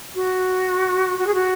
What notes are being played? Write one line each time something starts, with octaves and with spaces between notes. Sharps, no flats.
F#4
F#4
G#4
F#4